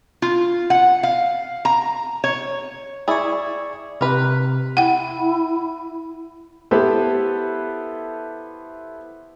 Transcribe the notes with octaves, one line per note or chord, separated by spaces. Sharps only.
F4
F#5
F5
A#5
C#5
E4 G#4 D5 C#6
C3 A#4 B4
E4 F#5 G5
B3 E4 G4 A4 B4 C5